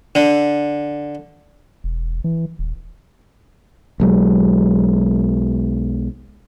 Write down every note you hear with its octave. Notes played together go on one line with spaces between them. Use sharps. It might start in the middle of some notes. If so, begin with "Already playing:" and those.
D3
E1
E3
D#1
B1 F#3 G#3